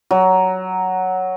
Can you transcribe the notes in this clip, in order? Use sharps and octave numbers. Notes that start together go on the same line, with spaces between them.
F#3